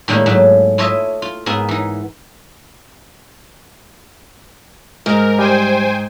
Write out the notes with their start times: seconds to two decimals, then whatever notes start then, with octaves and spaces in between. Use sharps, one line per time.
0.08 A2 D#3 G3 G#3 A#3
0.26 G#2 F#3 A3
0.78 E4 F4 A4 C#5 D#5 E5
1.22 F4
1.46 G#2 B3 G#4 A#4 E5
1.69 E3 D#4
5.06 G#2 A#4
5.39 G3 C5 G5 G#5